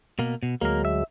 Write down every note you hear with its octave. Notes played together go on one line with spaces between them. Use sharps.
B2 A#3
B2
D2 F#3 G#3 A#3 A#4
E5